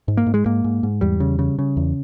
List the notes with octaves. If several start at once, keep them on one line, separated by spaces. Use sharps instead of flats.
G#2
A#3
G#2
G#3
G#2 A#3
G#2
G#2
E2 G3
C#3
C#3
C#3
E2